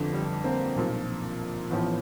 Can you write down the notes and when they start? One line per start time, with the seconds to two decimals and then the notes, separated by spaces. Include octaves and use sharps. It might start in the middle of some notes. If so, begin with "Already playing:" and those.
Already playing: G1 F2 D3
0.13 G3
0.44 A#3 C4
0.76 B1 A#2 F3
1.71 A1 A2 F3 B3 C#4